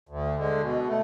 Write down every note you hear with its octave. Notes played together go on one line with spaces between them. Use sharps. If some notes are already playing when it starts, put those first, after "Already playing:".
D2
D3 G#3
B2
A3